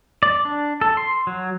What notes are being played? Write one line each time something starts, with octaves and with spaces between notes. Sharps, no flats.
D5
D4
A4
C6
F#3